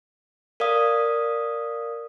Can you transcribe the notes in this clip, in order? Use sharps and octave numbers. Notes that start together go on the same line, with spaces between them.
A#4 D5 F5 D#6